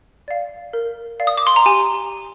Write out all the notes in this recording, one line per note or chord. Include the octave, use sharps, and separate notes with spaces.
D5 F5
A#4
D5 F5
D#6
D6
C6
A#5
G4 G#5